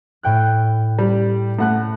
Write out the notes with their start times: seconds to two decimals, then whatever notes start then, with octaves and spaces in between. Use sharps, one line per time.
0.23 A2 G5 F#6
0.99 G3
1.59 A2 F#5 F#6